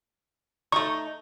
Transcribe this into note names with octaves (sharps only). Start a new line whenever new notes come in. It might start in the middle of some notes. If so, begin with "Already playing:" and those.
A3 D#4 C#6